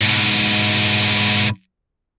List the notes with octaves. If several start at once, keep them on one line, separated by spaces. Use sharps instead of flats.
G#2 B2